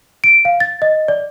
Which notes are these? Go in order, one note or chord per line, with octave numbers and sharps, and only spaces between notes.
D7
F5
A6
D#5
D5